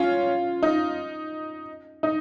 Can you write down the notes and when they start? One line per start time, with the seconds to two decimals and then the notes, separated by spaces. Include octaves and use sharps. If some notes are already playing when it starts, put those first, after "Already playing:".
Already playing: C#4 F4
0.63 D#4
2.03 D#4